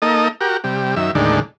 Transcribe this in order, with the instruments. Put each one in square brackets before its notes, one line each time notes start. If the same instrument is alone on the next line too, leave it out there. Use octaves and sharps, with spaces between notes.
[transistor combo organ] A#3 D#4 A4 D#5
F#4 G4 A#4
C3 G3
F#2 D#3 E5
D#2 A2 D3 D#3 G#3 D4